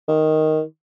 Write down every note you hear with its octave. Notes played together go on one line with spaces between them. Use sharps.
D#3